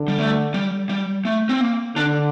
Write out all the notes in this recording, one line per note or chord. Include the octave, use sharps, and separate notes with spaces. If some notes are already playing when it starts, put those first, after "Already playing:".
Already playing: D3
G3
A3
G3
G3
A3
C4
A#3
D3 D4